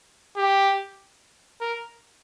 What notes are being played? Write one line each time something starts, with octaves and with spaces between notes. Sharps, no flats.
G4
A#4